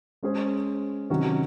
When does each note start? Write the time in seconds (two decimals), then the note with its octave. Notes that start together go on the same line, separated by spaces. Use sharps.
0.23 G#3 C#4 G#4 C5
1.10 C3 D#3 F#3 C#4 F#4